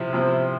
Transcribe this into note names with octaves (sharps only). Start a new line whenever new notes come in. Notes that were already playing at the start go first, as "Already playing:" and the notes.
Already playing: C3 F3 C4 E4
C3 F3 C4 E4